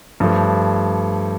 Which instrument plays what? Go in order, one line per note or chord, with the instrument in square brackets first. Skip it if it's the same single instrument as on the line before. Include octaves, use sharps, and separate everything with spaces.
[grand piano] G2 F3 A3